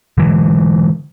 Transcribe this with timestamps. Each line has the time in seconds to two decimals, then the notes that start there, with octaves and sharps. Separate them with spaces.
0.18 D3 E3 G#3